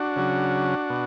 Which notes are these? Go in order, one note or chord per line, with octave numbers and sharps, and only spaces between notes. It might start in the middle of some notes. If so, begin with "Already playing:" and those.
Already playing: D4 F#4
C#3 F#3
B2